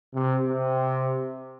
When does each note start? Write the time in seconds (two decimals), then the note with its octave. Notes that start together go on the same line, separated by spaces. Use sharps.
0.14 C3
0.47 C3